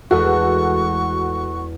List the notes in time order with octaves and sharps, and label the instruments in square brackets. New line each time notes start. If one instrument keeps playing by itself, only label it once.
[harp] E2 G#3 A3 [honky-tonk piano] F#4 A4 [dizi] C#6